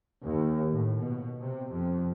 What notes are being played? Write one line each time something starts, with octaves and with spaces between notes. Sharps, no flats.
D#2
A2
B2
C3
F2